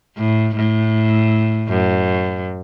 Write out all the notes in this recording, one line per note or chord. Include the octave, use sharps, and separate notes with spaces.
A2
A2
F#2